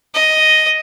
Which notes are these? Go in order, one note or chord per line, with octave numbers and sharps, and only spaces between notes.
D#5